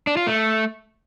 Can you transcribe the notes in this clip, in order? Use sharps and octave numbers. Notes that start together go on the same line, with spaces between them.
D4
F4
A3